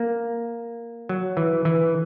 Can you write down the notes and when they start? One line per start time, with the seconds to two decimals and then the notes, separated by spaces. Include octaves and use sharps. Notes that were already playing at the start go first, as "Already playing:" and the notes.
Already playing: A#3
1.09 F#3
1.37 E3
1.65 E3